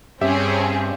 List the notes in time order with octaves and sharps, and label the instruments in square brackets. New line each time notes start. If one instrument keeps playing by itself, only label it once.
[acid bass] G2 [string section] C4 C#4 G#4 [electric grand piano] G4 E5